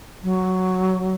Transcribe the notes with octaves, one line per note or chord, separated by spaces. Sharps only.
F#3